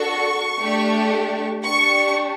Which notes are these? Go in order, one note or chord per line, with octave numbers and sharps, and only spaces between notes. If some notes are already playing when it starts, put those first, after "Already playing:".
Already playing: D4 F#4 A4 C#6
A3 D4 G4
D4 G4 C#6